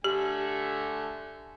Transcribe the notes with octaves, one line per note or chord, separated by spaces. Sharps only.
D3 A3 G4 G#5